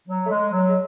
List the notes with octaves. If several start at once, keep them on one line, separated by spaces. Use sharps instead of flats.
F#3
A3
G#3
F#3
G#3